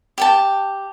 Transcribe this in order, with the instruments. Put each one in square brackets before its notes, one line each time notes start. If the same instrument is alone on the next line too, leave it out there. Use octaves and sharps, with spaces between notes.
[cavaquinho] G4 G5 A5